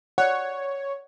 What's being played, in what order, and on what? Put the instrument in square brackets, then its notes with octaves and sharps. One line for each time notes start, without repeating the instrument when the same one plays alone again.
[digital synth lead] C#5 [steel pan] D5 F#5